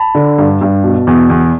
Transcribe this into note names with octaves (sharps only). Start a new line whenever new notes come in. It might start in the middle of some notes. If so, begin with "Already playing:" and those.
Already playing: A5 B5
D3
G2
G2
B2
E2
E2